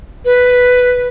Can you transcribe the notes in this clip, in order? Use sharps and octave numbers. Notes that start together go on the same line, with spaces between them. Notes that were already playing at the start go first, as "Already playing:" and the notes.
B4